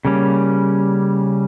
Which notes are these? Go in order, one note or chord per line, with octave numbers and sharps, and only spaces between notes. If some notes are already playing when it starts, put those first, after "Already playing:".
C#3 G3 A#3 C#4